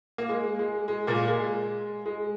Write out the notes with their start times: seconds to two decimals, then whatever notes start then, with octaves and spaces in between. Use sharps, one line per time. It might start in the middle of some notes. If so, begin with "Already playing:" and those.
0.18 A#3
0.29 G#3
0.59 G#3
0.88 G#3
1.07 A#2 A#3
1.28 G#3
2.06 G#3